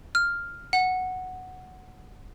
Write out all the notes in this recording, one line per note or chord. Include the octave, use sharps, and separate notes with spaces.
F6
F#5